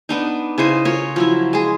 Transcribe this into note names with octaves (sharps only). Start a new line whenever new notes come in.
B3 D4 D#4
C#3 E4 C5 D#5
F4 A#4 C#5
F3 F#3 E4
G#3 G#4